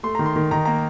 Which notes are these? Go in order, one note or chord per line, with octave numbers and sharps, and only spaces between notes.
A3 C6
D#3 A#5
C6
D#3
D#3 A#5
A#3 A#5